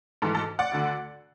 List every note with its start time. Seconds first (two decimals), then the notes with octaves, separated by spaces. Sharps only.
0.22 G#2 E3 A4
0.35 A4
0.59 D5 F#5
0.72 D2 D3